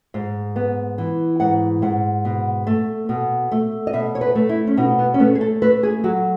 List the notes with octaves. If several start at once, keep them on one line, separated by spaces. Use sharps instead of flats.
G#2
B3
E3
G#2 F#5
G#2 F#5
B2
A3
B2
A3
D#5
B2 E5
C#5
B4
A3
E4
C#4
B2 D#4
B3
C#4
A3 B3
G#4
A4
A3 B4
G#4
F#3 F#4